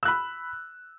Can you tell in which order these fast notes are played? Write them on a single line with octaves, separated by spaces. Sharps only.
E6 F#6 B5